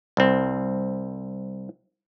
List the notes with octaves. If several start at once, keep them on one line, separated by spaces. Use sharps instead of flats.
C2 C4